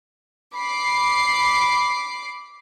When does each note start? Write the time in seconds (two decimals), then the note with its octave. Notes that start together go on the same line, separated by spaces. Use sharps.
0.55 B5 D6 C7